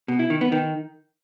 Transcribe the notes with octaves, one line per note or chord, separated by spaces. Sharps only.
B2
E4
D#3
B3
D#3